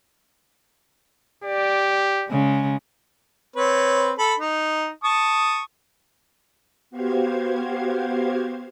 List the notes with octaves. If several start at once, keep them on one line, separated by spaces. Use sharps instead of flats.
G4 D5
C#3 G#3
C4 B4 C#5
A4 B5
D#4
A5 C#6 D#6
B3 F#4 G4 C5 F5 G#6